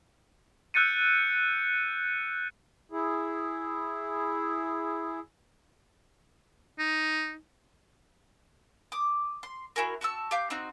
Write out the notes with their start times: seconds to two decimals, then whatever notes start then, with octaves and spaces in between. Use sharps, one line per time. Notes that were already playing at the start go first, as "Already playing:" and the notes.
0.74 E6 F#6 G6 A6 C#7 D#7
2.92 E4 G#4
6.79 D#4
8.92 D6 D#6
9.43 C6
9.76 E4 F#4 G#4 A#4
10.01 F#4 A5 C#6 E6
10.31 G4 F5 G6
10.50 C4 D#4 F#4